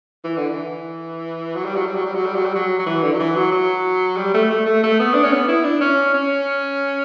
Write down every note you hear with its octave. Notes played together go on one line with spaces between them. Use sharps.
E3
D3
E3
F#3
G3
F#3
G3
F#3
G3
F#3
G3
F#3
G3
F#3
F#3
E3
D3
F#3
E3
F#3
F#3
G3
A3
A3
A3
A3
B3
D4
C#4
B3
E4
D4
C#4
C#4